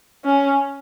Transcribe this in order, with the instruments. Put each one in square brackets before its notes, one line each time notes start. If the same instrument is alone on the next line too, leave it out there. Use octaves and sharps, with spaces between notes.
[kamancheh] C#4